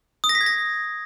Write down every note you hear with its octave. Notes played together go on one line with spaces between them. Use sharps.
D#6
A#6
B6
G#6
A#6